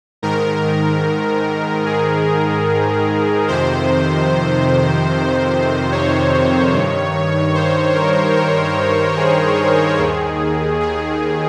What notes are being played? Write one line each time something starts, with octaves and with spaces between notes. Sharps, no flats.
G#2 D#3 A#4
G#4
F2 C3 D#3 C5
C#5
G2 D#3
C5
A#4
A#4
G#4
D#2 D#3
G#4